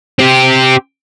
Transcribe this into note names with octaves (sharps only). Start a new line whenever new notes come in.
C4 G4